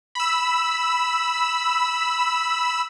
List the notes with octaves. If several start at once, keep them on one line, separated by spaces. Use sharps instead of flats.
B5 E6